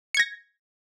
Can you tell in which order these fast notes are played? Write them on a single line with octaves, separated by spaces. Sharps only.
C#7 G#6 A#6